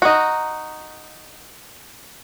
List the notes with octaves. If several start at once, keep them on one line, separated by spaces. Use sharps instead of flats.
D#4 F#4